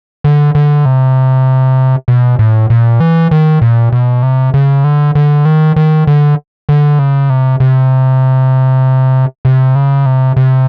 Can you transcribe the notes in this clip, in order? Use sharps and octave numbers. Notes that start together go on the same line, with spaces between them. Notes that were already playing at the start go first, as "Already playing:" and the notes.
D3
D3
C3
B2
A2
A#2
E3
D#3
A#2
B2
C3
C#3
D3
D3
D#3
D#3
D3
D3
C#3
C3
C3
C3
C#3
C3
C3